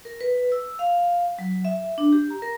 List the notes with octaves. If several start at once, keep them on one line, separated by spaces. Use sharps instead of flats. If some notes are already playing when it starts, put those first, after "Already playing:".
A#4
B4
E6
F5
F#3
E5
D4
G4
A#5
A#4